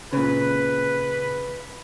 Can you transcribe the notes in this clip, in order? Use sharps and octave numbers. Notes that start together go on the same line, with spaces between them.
A#2 C#3 B4